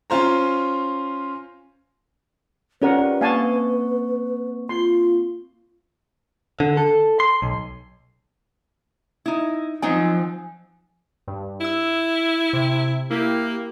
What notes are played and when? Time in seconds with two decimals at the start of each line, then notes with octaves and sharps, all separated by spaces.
0.10 C#4 F4 C5 A#5
2.82 C#4 F4 G4 A#4 B4 D5 F#5
3.21 A#3 C4 F5 G#5 A5 C#6
4.69 F4 C6
6.60 D3
6.77 A4
7.20 C6
7.42 B1
9.26 D#4 E4
9.82 F3 F#3 C4 D#4 G#5
11.28 G2
11.61 E4 E6 E7
12.53 C3
13.11 A#3 E4 G4